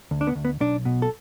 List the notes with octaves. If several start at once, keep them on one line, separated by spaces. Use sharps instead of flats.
D2
D4
B3
D2
B3
B1 D4
B2
A4